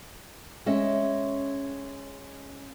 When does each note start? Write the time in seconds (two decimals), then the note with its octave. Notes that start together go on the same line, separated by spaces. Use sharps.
0.66 G#3 C#4 D#5 E5